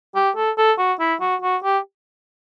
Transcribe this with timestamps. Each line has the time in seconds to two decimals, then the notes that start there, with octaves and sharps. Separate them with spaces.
0.15 G4
0.36 A4
0.58 A4
0.78 F#4
1.00 E4
1.21 F#4
1.42 F#4
1.64 G4